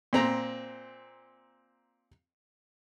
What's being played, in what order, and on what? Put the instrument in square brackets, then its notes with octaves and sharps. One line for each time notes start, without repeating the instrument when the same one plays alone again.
[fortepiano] A#2 C4 A#5